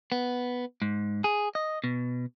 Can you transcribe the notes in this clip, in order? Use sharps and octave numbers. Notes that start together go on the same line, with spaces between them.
B3
G#2
G#4
D#5
B2